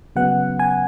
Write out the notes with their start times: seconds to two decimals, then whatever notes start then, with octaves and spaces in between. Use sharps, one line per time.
0.16 C#3 F#3 B3 F#5
0.59 G#5